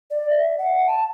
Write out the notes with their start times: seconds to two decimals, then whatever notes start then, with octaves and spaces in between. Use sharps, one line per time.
0.11 D5
0.30 E5
0.58 F#5
0.87 A5